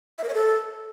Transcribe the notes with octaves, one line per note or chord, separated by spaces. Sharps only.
E5
A#4
C#5
A4